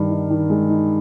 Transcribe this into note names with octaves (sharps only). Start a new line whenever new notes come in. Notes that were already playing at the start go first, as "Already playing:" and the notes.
Already playing: G2 D#3
D#4
D#3
G#3
D#4